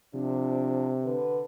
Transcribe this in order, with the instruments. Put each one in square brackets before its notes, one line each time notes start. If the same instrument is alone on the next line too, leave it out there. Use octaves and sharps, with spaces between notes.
[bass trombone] C3 [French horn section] F3 D4
[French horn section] D3 B4